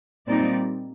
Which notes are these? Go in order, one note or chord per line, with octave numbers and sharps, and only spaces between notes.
A#2 G3 C4 D#4 D5